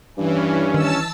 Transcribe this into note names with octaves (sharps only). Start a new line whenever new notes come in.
G2 E3 C#4
D#3 A5 E6